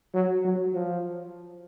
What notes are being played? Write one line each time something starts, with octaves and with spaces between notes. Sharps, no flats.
F#3
F#3
F3